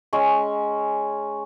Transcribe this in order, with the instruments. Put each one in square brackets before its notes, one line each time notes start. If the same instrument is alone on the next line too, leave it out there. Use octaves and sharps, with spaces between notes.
[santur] G#3 C#4 G#5 C#6